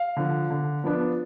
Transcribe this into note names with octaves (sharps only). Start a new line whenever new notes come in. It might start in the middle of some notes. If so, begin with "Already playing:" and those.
Already playing: F5
D3 F3
D3
F3 B3 D4